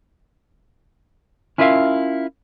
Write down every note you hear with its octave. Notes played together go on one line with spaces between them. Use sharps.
C#4 E4 F4 A#4 E5 F5